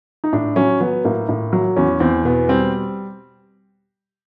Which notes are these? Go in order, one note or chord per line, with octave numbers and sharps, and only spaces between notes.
D#4
A2 D4
F#3 C#4
F#3 B3
A2 A#3
A2
F#3
E2 C#4
E2 C4
B2 B3
G3 C4